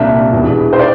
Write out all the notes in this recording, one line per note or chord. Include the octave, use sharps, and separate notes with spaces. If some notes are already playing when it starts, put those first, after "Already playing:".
Already playing: C2 A#2 G3 A#3 D4 E5
E1 E2 E3
C5
D5